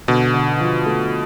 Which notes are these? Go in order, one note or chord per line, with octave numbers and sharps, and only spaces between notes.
B2 D3
D3
F3
A3